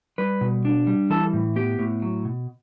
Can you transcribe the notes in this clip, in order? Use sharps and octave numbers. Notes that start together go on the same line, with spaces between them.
G3 B4
B2
D4
G3
E3 A4
A2
B3 G4
A2
F#3
B2